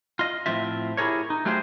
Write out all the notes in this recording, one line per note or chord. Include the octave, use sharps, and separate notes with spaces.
F4 D#5
A2 F3 C4 F4 E5
E4 G4 G#4 A#4 C#5
D#4
F#3 A3 F4 G4 G#4 C5